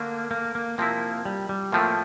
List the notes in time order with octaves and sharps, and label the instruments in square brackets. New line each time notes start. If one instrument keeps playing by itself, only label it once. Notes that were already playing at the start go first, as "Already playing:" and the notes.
Already playing: [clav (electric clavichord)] D3 A3 D4 [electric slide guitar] A#3
[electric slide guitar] A#3
A#3
[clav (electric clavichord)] C3 F3 C4 E4 [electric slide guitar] A#3
[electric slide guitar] G3
G3
[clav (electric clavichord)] A2 F3 A3 C4 [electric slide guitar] A#3